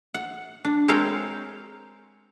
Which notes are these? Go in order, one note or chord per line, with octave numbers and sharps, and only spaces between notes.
F#5
D4
G#3 C4 A#4 C#5 F5 G5